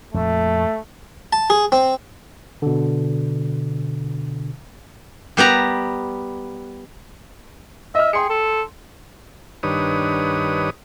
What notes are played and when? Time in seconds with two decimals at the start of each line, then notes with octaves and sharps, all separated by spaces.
0.14 F2 A#2 F3 A3
1.33 A5
1.50 G#4
1.72 C4
2.62 B2 D3
5.37 G3 B3 G4 A#5
7.95 D#5 E5 F6
8.13 G#4 G5 C6 C#7
8.30 A4
9.63 G2 D#3 D4 B4 C#5 D#6